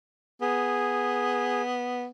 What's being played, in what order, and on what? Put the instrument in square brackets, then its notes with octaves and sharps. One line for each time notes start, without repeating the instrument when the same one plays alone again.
[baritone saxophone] B3 [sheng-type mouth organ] G#4